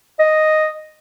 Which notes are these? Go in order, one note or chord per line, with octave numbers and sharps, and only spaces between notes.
D#5